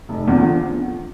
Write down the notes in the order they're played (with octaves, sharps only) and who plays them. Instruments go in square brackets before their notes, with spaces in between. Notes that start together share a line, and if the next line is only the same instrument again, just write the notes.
[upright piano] F1
E2 D3 F3